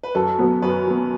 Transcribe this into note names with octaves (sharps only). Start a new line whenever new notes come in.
B4
F#2 A4
F#3 B3
F#2 B4
F#3 B3